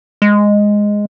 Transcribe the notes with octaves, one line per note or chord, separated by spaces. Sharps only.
G#3